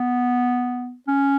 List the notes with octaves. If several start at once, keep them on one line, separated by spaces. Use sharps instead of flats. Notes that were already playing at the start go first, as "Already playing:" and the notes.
Already playing: B3
C#4